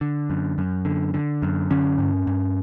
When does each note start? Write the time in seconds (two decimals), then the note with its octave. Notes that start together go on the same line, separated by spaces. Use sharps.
0.01 D3
0.30 F#2
0.58 F#2
0.85 D3
1.14 D3
1.42 F#2
1.70 D3 C#4
1.98 G2
2.27 G2